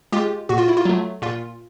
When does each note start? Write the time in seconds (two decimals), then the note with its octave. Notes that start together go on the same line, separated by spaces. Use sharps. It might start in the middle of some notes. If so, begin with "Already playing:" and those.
0.12 G#3 F4 G4
0.49 A#2 F#4
0.58 F4
0.68 E4
0.77 F4
0.85 F#3 A3
1.22 A#2 F4